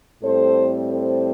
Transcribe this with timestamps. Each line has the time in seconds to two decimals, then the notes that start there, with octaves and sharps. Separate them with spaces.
0.22 A2 G3 C4 A4 C5
0.91 A4 C5